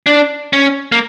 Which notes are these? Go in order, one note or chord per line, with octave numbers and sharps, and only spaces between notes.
D4
C#4
A#3